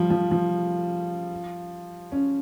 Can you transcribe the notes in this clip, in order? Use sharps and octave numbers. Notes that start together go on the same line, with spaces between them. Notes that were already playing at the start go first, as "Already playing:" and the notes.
Already playing: F3 G3
F3
F3
C#4